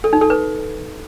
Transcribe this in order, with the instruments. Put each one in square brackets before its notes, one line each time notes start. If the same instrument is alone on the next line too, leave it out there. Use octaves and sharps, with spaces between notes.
[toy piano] A4
D#4
A4
B4